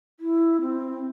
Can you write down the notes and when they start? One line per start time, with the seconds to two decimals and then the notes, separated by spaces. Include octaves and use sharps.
0.20 E4
0.61 C4